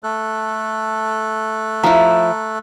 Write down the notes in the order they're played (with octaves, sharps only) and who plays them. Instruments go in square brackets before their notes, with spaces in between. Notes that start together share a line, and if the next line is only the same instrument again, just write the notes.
[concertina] A3 A4 F#6
[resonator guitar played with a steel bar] F3 E4 [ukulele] A#5